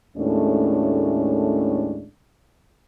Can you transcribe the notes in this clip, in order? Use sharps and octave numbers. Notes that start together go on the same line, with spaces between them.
D#2 A2 G#3 A3 C#4 D4